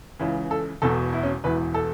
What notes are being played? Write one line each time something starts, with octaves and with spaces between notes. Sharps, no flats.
C#2 C#3 E3
A4
E1 E2 B2 A4
E4
C#4
E1 E2 E3 B4
A4